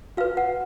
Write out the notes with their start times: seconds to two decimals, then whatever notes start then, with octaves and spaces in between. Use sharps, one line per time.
0.17 F#4 B4 F5
0.37 F#5